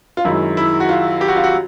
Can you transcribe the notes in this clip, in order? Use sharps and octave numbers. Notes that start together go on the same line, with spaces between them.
F4
F#2 D#3 G#3 E4
E4
F#4
F4
G4
F#4
F4
F#4